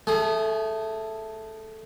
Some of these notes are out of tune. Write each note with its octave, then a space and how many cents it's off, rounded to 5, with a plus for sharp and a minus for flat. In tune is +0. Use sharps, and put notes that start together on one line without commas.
A3 +0 G#4 -15 G#5 +45